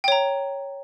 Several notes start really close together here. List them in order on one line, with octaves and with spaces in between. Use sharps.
G5 C#5 A#5